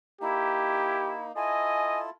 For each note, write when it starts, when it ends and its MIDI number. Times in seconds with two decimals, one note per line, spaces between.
0.21 1.32 58
0.21 1.32 63
0.21 1.25 64
0.21 1.15 67
1.36 2.10 64
1.36 2.10 65
1.36 2.10 69
1.36 2.04 75
1.36 2.00 80